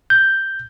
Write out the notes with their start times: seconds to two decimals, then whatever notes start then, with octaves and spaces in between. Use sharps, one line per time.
0.10 G6